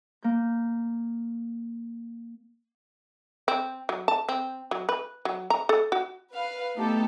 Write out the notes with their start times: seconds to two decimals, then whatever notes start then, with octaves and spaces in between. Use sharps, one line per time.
0.23 A#3 G6
3.48 C4
3.89 F#3
4.08 A5
4.29 C4
4.71 F#3
4.89 B4
5.25 F#3
5.50 A#5
5.69 A4
5.92 F#4
6.33 B4 F5
6.75 A3 B3 D#4 G4 A4